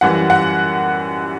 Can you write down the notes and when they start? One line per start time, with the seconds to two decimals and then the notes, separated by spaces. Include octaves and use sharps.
0.01 F#2 E3 G3 F#5
0.30 F#5